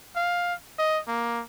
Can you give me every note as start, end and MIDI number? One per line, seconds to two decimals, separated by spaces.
0.16 0.54 77
0.79 0.99 75
1.08 1.42 58